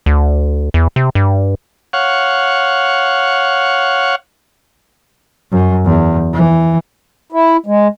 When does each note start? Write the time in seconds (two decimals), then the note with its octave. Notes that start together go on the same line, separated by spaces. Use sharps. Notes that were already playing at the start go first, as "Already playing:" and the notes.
0.06 D2
0.74 E2
0.96 C3
1.15 G2
1.93 C#5 F5 F#5
5.51 F#2
5.85 E2
6.33 E3
7.32 E4
7.66 G#3